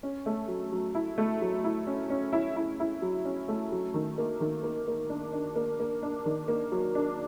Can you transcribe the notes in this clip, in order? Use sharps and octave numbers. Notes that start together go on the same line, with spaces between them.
C#4
A3
F#3
F#3
E4
A3
F#3
E4
C#4
C#4
E4
E4
E4
F#3
C#4
A3
F#3
D#3
A#3
D#3
A#3
A#3
D4
D4
A#3
A#3
D4
D#3
A#3
F#3
D4